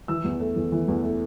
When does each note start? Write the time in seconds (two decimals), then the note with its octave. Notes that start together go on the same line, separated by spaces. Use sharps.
0.08 E3 E6
0.24 E2
0.40 A3
0.56 E2
0.72 E3
0.88 E2
1.03 A3